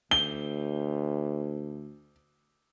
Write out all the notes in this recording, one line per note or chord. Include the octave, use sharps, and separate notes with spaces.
D2 G7